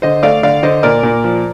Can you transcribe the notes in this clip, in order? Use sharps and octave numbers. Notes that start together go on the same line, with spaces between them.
D3 C5 D#5
A3 D5 F5
D3 D5 F5
D3 C5 D#5
A#2 A#4 D5
A#2
F3